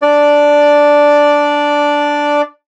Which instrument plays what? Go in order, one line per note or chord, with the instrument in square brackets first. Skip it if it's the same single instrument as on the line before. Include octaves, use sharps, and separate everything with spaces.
[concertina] D4 D5